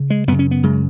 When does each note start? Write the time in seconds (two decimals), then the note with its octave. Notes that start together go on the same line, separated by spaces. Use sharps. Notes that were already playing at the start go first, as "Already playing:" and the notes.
Already playing: C#3
0.10 G#3
0.27 F#2 C#3 B3
0.39 C#4
0.51 B3
0.63 F#2 C#3 G#3